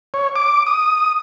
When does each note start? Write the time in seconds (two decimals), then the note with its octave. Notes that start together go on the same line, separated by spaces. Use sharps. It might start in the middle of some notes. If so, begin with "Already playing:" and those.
0.14 C#5
0.36 D6
0.67 D#6